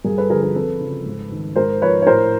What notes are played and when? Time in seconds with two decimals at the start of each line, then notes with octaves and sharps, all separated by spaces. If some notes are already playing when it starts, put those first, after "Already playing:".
0.04 G2 G#4 A#4
0.18 A4 B4
0.29 D3 F3 G#4 A#4
0.43 G#4 A#4
0.55 F2 A4 B4
0.80 C#3 F3
1.06 G#2
1.31 D#3
1.56 G#2 A#4 C5
1.82 F3 B4 C#5
2.02 C#5
2.06 A2 A#4 C5